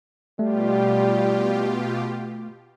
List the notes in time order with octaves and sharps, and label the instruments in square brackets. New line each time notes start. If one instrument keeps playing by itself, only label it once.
[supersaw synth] B2 F4 G4 [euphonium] G3 [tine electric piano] A3